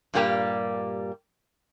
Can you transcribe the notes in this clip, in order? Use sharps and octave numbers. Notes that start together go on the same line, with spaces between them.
G2 A#2 G3 A#3 G4